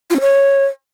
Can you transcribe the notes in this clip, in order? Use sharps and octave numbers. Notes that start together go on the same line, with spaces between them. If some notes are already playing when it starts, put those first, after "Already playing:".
F4
C#4
C#5